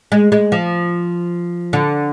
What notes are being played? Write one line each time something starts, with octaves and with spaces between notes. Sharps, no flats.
G#3
G#3
F3
D3